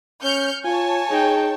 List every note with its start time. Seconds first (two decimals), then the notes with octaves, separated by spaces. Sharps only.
0.23 C#4 F6 G6 C#7
0.64 F4 C#5 G#5 A5
1.10 D#4 G#4 G5